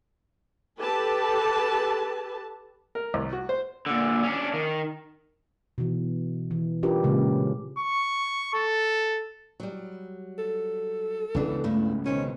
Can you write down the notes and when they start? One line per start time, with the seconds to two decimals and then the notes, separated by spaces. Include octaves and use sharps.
0.79 G4 A4 B4 A5
2.95 A#4
3.14 C2
3.33 F#4
3.49 C5
3.86 A#2 D3
4.23 C#4 D4
4.54 D#3
5.78 B2 E3
6.51 E3
6.83 C#4 D4 F4 G4 A#4 B4
7.03 A#2 C#3 G#3
7.78 C#6
8.54 A4
9.60 F#3 G3
10.39 A4
11.35 C#2 C#3 E3 B3 D4
11.64 G2 A3 E4
12.06 B2 D#3 C4 C#4